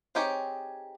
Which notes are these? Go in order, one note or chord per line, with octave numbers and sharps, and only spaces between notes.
C4 D#4 G4 G#4 C#5